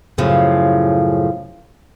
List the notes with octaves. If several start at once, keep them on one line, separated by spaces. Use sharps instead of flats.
F#2 A2 C#3 F3